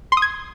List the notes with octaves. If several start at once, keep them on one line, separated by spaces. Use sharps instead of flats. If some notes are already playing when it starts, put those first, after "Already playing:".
C6
D#6
G#6